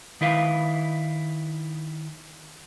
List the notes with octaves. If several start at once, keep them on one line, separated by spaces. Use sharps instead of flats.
D#3 E4 B4 F5